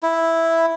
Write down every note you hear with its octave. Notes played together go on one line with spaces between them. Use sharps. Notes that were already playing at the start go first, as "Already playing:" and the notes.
E4